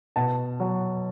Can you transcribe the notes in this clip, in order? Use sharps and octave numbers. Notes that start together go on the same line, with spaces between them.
B2 A5
F#3